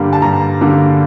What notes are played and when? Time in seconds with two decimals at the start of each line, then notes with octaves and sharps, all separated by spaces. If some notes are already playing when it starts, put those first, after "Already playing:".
Already playing: G2 D3 G3 A#3
0.13 A5
0.22 G2 A#5
0.61 D3 G3 A#3